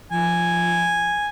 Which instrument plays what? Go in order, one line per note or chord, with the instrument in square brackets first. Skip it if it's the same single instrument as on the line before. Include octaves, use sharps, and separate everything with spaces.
[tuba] F3 [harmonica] G#5